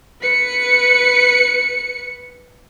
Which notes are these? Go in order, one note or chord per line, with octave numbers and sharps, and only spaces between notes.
B4 C#7